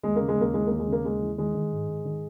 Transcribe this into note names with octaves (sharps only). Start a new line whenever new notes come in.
D#2 G#3
C#3 A#3
G#3
D#2 A#3
E3 G#3
D#2 A#3
G#3
C#3
A#3
D#2 G#3
E3
D#3 G#3
D#3
G#2
G#2
D#3